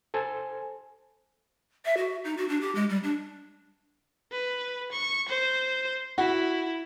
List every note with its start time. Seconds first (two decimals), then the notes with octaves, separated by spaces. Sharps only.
0.14 A4 C5 G#5
1.85 E5
1.97 F#4
2.24 D#4
2.37 F#4
2.49 D4
2.61 G4
2.75 G#3
2.89 G3
3.03 D4
4.32 B4
4.92 C#6
5.29 C5
6.18 E4 F#4